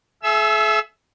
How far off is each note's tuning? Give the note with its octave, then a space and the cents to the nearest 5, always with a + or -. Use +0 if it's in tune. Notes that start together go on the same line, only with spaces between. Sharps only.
G#4 +45 E5 +15 E6 +0